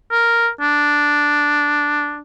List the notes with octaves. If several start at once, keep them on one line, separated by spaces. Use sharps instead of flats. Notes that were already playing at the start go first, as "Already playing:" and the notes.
A#4
D4